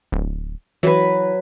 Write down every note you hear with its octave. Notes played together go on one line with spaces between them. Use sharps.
D1
E3 F#3 B4